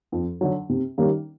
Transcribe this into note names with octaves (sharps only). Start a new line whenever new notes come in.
F2
D3 F#3
C3
D#3 G3 A#3 C#4